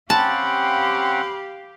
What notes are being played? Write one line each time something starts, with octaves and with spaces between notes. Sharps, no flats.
C4 C#4 G4 F5 F#5 A5 B5